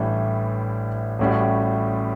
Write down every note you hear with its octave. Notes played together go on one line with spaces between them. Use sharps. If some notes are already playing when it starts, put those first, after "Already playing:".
Already playing: A1 A2 E3 G3 D4
A1 A2 G3 C#4 F#4